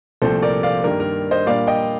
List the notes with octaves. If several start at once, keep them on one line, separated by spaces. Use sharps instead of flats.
C2 A#2 F3 A3 C4 A4 C5
A#4 D5
D5 F5
G2 D#3 A#3 D4 A#4
A#4
C5 D#5
A#2 G3 A#3 D4 D5 F5
D#5 G5